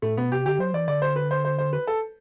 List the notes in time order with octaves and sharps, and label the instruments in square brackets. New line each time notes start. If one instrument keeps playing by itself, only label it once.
[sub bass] A2 [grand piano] A3
[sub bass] B2 [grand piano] B3
[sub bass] C3 [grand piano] G4
[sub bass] D3 [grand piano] G4
[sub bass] F#3 [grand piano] C5
[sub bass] E3 [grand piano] D5
[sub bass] D3 [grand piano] D5
[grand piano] C5
B4
C5
C5
C5
B4
A4